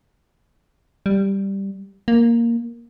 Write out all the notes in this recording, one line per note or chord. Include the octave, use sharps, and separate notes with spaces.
G3
A#3